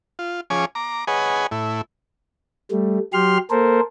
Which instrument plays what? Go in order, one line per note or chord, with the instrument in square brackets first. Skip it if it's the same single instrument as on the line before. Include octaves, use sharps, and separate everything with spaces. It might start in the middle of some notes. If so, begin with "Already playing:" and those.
[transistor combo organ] F4
F3 C#4 G#4 C#5 G#5 D6
A#5 D6
G#4 B4 C#5 D#5 F#5 G#5
A2 E4
[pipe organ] G3 A3
F#3 G4 C6 F6
A#3 A4 A#4 C5